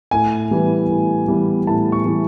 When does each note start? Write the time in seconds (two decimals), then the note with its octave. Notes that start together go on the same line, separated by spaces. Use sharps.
0.11 A2 G#5
0.51 E3 G3 B3
0.89 A2
1.28 E3 G3 B3
1.67 A2 A5
1.92 C#6
2.05 E3 G3 B3